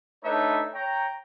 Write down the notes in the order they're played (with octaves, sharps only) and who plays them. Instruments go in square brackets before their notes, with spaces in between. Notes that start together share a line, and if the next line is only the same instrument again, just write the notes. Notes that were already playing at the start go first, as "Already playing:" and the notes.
[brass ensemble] A3 D4 D#4 B4 C#5 E5
C#5 G5 A#5